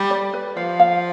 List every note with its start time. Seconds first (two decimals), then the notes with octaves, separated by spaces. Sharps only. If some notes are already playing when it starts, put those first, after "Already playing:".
Already playing: G3
0.10 D5
0.34 B4
0.56 F3 F5
0.80 F5